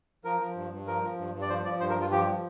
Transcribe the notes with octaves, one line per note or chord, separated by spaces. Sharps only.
F3 A#4
F3
G2
G2
F3 A#4
F3
G2
G2
D5
F3 C5
F3 D5
G2 C5
A#4
G2
F4
F3 G4
F3